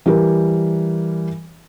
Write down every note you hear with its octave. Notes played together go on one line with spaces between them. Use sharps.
E3 G3 G4 A#4